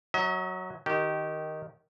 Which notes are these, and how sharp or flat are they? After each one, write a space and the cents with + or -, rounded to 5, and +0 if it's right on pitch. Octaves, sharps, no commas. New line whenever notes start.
F#3 +0 D#5 +45
D#3 +0 G4 -20